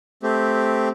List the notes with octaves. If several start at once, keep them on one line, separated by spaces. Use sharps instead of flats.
A3 C4 G4